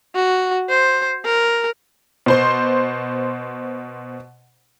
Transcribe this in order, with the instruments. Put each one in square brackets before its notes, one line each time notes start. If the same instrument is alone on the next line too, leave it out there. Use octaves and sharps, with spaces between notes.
[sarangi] F#4
C5
A#4
[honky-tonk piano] B2 C5 C6